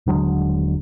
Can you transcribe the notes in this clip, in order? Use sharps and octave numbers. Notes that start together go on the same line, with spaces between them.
D#1 D3 F#3 G#3